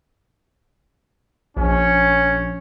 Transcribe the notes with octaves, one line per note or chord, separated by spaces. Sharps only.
A#1 C#4